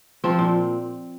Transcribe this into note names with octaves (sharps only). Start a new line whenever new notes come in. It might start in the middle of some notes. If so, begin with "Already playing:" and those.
F3 C4
A#2